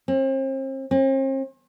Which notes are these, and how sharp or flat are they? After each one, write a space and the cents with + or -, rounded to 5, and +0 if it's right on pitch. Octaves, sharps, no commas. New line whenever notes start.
C4 +40
C4 +45